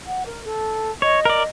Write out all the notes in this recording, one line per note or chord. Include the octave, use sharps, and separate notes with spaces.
F#5
A#4
A4
C#5 D#5
A#4 D5